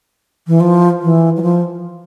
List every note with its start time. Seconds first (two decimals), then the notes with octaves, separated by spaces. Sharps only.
0.47 E3
0.60 F3
1.01 E3
1.37 F#3
1.42 F3